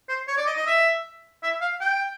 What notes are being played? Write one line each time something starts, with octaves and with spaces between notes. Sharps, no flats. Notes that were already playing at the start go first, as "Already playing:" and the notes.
C5
C#5
D5
D#5
D#5
E5
E5
F5
G5